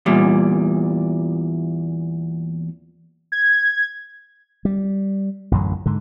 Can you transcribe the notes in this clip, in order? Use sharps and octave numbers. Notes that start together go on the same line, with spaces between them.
E2 A#2 G3
G#6
G3
A1 F#2 D3 F#3
G#2 D3